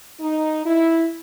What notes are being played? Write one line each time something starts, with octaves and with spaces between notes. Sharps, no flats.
D#4
E4